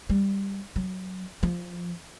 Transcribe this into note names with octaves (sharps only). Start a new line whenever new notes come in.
G3
F#3
F3